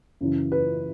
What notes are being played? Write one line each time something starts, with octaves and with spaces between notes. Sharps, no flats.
F#2 C#3 E3
B4